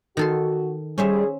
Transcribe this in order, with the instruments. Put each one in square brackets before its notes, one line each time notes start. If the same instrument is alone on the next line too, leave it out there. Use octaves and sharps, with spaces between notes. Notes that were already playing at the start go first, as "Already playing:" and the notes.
[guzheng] D#3 A4 C6 [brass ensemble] F#4
[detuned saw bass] G3 [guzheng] C#4 C5 E5 [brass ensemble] G#4